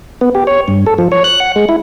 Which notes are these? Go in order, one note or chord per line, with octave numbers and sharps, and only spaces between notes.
B3
G4
C#5
G2
A4
F3
C#5
F#6
F#5
G#3
E4